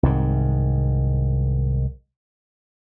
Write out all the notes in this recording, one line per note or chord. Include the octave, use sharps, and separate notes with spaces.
C2 G#2 D#3